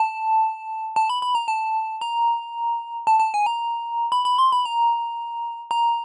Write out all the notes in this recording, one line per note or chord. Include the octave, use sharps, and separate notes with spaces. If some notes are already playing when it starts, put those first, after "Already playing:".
Already playing: A5
A5
B5
B5
A#5
A5
A#5
A5
A5
G#5
A#5
B5
B5
C6
B5
A#5
A#5